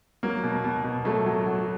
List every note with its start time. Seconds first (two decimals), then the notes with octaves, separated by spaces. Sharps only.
0.23 F#3 A#3
0.44 B2
0.64 B2
0.84 B2
1.05 F#3 A3
1.26 F#3
1.46 F#3